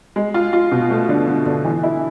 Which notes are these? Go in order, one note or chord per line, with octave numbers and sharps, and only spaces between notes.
G#3
F4
F4
B2
A3
D3
D3
D3
E3
E4